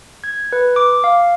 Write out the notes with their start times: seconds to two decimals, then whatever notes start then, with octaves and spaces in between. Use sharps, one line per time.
0.24 G#6
0.53 B4
0.76 D6
1.04 F5